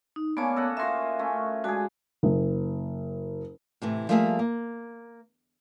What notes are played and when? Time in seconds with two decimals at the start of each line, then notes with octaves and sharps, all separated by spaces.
0.16 D#4
0.37 A#3 B3 C#4 D4 C#5
0.56 A4 D#5 F#5
0.77 A#3 F4 F#4 A#4 E5
1.19 A3 C#4
1.64 G#3 D4 F#4 G#4
2.23 F#1
3.82 A2 C3 E3
4.09 F3 G3 A3 A#3 G#4 E5
4.39 A#3